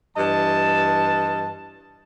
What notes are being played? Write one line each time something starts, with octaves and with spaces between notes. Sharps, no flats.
G2 E3 D#5 A5